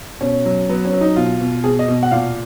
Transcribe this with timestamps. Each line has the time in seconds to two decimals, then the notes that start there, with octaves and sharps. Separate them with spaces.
0.21 B2 C#4
0.46 F#3
0.69 F#3 B3
0.85 C#4
0.93 F#3
1.01 D#4
1.16 B2 F4
1.40 B2
1.64 B2 G#4
1.79 D#5
1.88 B2
2.03 F#5
2.11 A#2 F5